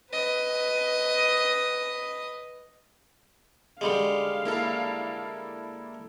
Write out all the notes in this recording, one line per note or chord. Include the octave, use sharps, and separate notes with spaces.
B4 D#5
D3 G3 G#3 F5
A#3 E4 A4